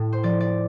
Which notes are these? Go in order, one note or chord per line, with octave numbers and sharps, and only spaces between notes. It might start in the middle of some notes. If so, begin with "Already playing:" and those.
Already playing: A2
C5
F3 D5
D5